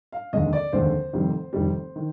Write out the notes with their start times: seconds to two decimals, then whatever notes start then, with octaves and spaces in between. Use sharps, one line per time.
0.12 F5
0.33 F1 D#2 D3 G#3 D#5
0.53 D5
0.73 F1 D#2 D3 G#3 C5
1.13 F1 F2 D#3 G3
1.53 F1 F2 D#3 G3
1.96 D#3